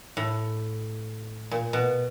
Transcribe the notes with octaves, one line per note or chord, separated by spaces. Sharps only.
A2
A#2
B2